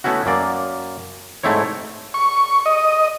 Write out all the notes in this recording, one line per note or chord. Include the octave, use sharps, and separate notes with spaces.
A3 B3 C#4 E4 F#4
F#2 A#3 D5
G#2 A3 C4 E4 C#5
C#6
D#5